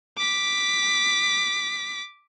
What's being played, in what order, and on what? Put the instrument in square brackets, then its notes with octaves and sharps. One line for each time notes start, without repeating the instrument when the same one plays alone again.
[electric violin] D6 B6